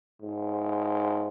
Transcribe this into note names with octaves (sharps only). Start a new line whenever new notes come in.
G#2